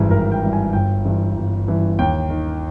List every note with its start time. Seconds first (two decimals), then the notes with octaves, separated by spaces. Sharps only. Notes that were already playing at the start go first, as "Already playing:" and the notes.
Already playing: G#1 G2 E3 G#4
0.10 G#1 A#4
0.32 G5
0.42 G2 E3
0.53 G#5
0.73 G1 G5
1.05 G2 E3
1.36 G1
1.68 G2 E3
1.99 D#2 G5
2.30 D#3